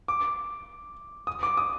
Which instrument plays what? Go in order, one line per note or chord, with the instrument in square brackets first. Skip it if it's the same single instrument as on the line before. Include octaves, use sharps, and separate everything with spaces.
[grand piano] D6
D#6
D6
D#6